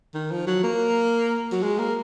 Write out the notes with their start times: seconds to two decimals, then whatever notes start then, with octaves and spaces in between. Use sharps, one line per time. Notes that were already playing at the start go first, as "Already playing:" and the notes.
0.14 D#3
0.31 F3
0.47 F#3
0.63 A#3
1.52 F#3
1.63 G#3
1.79 A#3